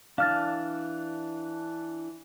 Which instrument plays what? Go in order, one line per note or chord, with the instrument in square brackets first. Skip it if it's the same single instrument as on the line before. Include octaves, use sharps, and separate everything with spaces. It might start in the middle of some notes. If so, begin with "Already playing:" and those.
[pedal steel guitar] E3 D4 [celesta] F5 F6 A6